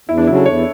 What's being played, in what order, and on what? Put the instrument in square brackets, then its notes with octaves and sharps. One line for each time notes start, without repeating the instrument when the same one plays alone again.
[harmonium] E2 [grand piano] E4
[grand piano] D4
[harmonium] C#3 F#3 [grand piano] E4
[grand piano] A4
[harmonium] E2 [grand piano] C#5